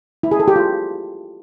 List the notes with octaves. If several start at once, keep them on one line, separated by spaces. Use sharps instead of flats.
E4
G#4
A4
G4
F4